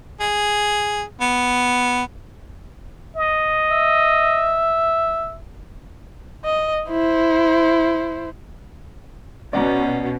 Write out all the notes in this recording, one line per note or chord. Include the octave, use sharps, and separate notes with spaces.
G#4
B3
D#5
E5
D#5
E4 C5
B2 C#4 D5 F#5 A#5